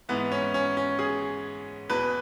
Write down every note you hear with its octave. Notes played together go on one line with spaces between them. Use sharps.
G#2 E3 B3
C#4
C#4
C#4
G#4
E2 B2 B4